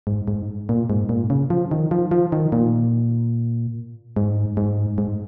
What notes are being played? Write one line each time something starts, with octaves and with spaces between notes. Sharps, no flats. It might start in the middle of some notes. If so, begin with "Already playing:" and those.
G#2
G#2
A#2
G#2
A#2
C#3
F3
D#3
F3
F3
D#3
A#2
G#2
G#2
G#2